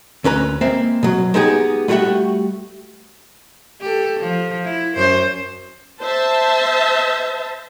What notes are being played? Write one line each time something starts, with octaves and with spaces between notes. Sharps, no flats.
D2 C#4 B4 A#5
G#3 A#3 C4 C5 E5
B2 F#3
G#3 B3 D#4 G4 G#4
G3 A3 F#4 G4 E5 F#5
G4 A4
F3
E4
F#2 C5
C5 E5 A5